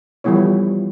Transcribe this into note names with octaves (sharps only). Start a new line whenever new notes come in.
E3 F3 G3 B3 E4 C#5